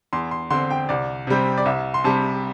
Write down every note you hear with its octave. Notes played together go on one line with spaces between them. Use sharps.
E2 C6
C6
D3 C4 C6
G5
C2 D5
C3 G3 C4
D5
C2 E5
C6
C3 G3 A5